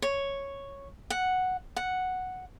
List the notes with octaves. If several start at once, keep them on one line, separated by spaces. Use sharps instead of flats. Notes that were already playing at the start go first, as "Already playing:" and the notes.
C#5
F#5
F#5